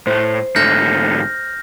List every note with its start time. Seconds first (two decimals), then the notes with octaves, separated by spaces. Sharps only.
0.07 A2 A3 C5
0.56 G#2 D3 A3 F6 G6 A#6